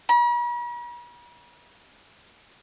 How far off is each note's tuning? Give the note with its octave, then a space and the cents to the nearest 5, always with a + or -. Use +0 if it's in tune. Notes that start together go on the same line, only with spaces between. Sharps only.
B5 -45